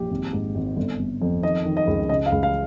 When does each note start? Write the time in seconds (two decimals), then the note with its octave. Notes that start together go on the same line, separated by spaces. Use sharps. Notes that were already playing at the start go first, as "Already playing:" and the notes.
Already playing: A#1 G4
0.10 G#1
0.33 G#2
0.55 G#1
0.77 G1
0.99 G1
1.22 F2
1.43 D#3 D#5
1.65 D#3
1.77 D#5
1.87 C#2
2.09 C#3 D#5
2.26 F5
2.32 C#2
2.43 F5